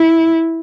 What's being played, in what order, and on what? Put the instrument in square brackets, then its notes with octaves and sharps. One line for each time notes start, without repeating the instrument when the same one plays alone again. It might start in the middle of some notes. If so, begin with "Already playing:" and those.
Already playing: [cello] E4